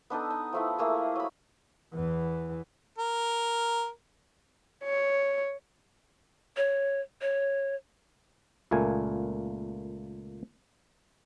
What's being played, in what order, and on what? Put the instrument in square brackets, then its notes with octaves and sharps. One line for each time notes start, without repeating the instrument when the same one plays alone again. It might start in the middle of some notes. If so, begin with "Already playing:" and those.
[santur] B3 D4 D#4 A4
D#4
F3 A3 E4
A3 A#3 G#4
F#3 B5
[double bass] E2 E3
[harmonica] A#4
[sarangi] C#5
[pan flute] C#5
C#5
[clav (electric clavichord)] C#2 A#2 A3 A#3 G#5